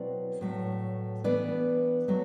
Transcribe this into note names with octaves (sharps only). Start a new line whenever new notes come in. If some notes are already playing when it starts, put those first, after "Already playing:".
Already playing: B2 F#3 C4 E4 B4 D5
A2 F#3 A3
E3 B3 D4 B4 D5
F#3 A3